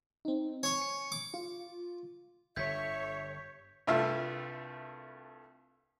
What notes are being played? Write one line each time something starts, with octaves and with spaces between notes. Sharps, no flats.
C4 D#4
C#5 G#5 C#6
C#7
D6
F4
G1 G2 D3 C#5 E5 G6 G#6 B6
C2 G2 A3 F4 E5